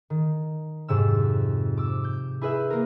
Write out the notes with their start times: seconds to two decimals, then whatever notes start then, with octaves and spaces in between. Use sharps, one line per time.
0.10 D#3
0.88 F2 G#2 C3 E6
1.77 D6 E6
2.04 G6
2.41 E4 G#4 B4 E5
2.70 A#3 A#4